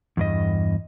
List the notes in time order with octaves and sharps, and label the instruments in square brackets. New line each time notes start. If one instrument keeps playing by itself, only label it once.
[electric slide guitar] E2 G2 D#5